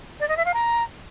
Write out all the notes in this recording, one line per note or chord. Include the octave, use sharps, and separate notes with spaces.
D5
D#5
E5
F5
A#5